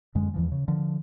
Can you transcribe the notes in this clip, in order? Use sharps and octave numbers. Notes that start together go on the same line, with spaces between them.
F#2 D3 G#3
E2 E3 F3
C#3
D3 F3